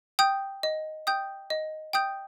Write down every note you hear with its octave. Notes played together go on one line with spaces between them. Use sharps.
G5 D#6 G6
D#5
G5 D#6 G6
D#5
G5 D#6 G6